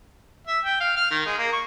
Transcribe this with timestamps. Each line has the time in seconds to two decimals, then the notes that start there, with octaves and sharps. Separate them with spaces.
0.48 E5
0.64 G5
0.81 F5
0.96 F6
1.11 D#3
1.26 G#3
1.38 A#3
1.53 C#6